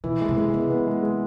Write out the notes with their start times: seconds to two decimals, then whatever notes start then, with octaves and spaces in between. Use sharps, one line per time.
0.04 B2 E3
0.21 G#3
0.29 C3
0.37 G#3
0.53 C3 B3
0.70 B3
0.87 G#3
1.03 G#3